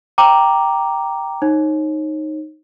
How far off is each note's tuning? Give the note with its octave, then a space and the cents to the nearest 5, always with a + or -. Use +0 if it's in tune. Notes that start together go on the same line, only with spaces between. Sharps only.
G5 +0 A#5 +0 D6 +0
D#4 -5 C#5 -35